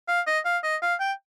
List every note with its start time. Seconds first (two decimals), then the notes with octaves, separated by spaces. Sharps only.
0.08 F5
0.27 D#5
0.45 F5
0.63 D#5
0.82 F5
1.00 G5